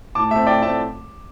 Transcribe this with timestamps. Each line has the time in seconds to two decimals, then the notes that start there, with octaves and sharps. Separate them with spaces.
0.15 A2 A5 D6
0.31 A3 C4 E5 A5
0.47 A2 D5 G5
0.62 A3 C4 E5 A5